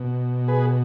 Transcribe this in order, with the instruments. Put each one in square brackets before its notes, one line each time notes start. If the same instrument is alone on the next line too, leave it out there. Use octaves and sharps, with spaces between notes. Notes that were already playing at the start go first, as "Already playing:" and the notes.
Already playing: [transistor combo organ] B2
G#4 B4